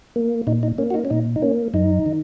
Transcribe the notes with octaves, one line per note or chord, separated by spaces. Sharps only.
A#3
A#2 D#4
D#4
A#3 C#4
F#4
D#4
C#4
A#2 D#4
D#4
A#3 C#4
F#2 D#4
D#3